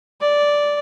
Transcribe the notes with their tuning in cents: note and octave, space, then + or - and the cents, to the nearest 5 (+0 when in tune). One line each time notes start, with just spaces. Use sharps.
D5 -5